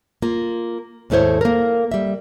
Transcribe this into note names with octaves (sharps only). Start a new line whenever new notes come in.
A#3 F4
D#2 G#2 A3 E4 C5 C#5
A#3 A#4
G3 E5